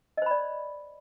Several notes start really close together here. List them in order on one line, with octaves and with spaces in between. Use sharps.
D#5 C5 B5 D5